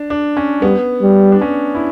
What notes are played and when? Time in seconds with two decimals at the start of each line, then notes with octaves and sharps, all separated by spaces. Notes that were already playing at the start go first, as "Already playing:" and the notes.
Already playing: D4
0.10 D4
0.37 C#4
0.62 G3 B3
1.02 G3
1.32 D4
1.42 C#4
1.75 E4